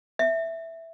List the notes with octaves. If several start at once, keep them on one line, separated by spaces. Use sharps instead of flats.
E5